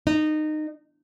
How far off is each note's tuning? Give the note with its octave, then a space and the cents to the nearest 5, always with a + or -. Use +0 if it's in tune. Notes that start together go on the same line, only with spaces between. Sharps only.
D#4 -20